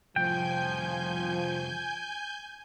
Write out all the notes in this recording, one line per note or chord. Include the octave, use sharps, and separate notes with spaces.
C2 F2 F3 G5 G#5 G6